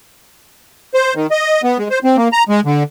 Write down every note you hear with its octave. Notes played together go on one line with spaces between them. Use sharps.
C5
D#3
D#5
B3
G#3
C5
C4
A#3
A#5
G#3
D3